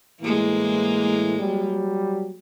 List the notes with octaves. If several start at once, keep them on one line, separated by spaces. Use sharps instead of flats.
A2 E3 G#3 A#3
F#3 G3